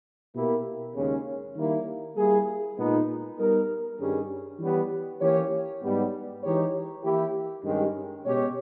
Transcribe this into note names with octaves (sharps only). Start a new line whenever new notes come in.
B2 A#3 E4 G4 A#4
D#2 C#3 G#3 C#4
D#3 G3 A#3 E4
G3 A#3 E4 G#4
A#2 G#3 B3 D#4
G3 B3 D#4 A#4
G2 D#3 G3 C#4 G#4
E3 G3 B3 G4 C#5
E3 A#3 C#4 G4 C#5
G#2 G3 B3
E3 G#3 D#4 G4 C#5
E3 A#3 E4 G4
G2 D#3 G#3 C#4 G4
B2 G#3 C#4 G4 C#5